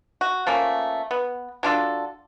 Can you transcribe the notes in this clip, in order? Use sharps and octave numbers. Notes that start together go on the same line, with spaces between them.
F#4
F3 A3 A#3 C#4
B3
F#3 D4 F4 A4